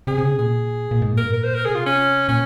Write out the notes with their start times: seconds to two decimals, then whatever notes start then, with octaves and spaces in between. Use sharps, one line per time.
0.07 C3 G#4
0.18 C3
0.23 C#3
0.33 C3
0.39 A#2 G#4
0.91 A#2
1.02 G#2
1.13 A#2 A#4
1.23 G2
1.33 A#2 A#4
1.44 C5
1.54 A#4
1.65 C3 G#4
1.75 F4
1.86 C#4
2.28 A#2 C#4